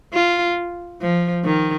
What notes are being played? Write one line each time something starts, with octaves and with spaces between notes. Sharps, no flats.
F4
F3
D#3